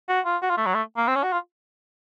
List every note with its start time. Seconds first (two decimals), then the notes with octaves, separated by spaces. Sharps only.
0.09 F#4
0.25 F4
0.42 F#4
0.50 F4
0.58 A3
0.66 F#3
0.74 A3
0.97 A#3
1.08 C4
1.16 C#4
1.23 F#4
1.32 F4